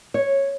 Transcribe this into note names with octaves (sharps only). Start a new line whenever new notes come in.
C#5